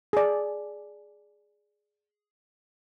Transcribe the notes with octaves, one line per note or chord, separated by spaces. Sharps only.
G#4 D5